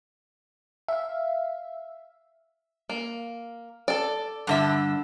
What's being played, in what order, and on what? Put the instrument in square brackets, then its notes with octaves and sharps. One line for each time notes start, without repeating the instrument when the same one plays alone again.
[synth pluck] E5 F5
[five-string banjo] A#3
A4 D5
[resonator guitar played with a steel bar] G2 D3 E5